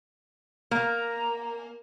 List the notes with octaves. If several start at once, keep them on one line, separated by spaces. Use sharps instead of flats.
A#3 A#5